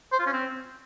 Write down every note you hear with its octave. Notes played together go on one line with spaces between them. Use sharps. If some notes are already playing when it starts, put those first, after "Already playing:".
C5
F4
C#4
C4